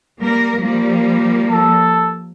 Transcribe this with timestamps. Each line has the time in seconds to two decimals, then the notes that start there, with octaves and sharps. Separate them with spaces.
0.21 G3 A#3 A#4
0.62 F3 G3 A#3
1.51 A4